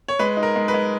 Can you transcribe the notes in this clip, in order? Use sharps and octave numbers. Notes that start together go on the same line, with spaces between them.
C#5
G#3 B4
D#4
A#4
G#3
B4
G#3